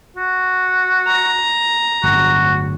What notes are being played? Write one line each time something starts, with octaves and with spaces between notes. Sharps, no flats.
F#4
A#5
D1 G1 D2 F#4